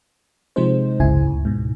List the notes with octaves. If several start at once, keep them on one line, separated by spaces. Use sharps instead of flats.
C3 F3 G#3 C4 D#4 C5
G#1 C#2 F#2 C#3 E4 G#5
D2
G#2 B2